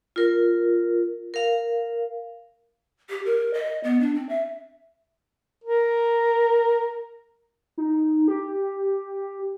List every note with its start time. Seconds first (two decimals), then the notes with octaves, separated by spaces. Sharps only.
0.16 F4 A#4
1.34 A#4 F5
3.09 G4
3.26 A#4
3.54 D#5
3.84 B3
4.01 D4
4.15 C4
4.29 E5
5.64 A#4
7.78 D#4
8.28 G4